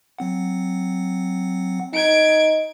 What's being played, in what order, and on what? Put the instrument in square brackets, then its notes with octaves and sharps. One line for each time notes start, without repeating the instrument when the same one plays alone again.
[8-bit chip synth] F#3 C4 F#5
[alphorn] D#4 [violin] G#6 D7